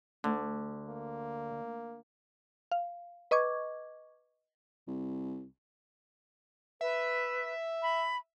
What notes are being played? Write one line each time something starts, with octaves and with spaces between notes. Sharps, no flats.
D2 D3
A#3
F5
B4 D#5 C#6 D6 G#6
C2
B4 E5
B5